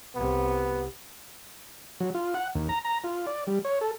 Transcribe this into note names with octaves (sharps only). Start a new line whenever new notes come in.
C2 C3 B3
F#3
F4
F#5
D#2
A#5
A#5
F4
D5
G3
C#5
A4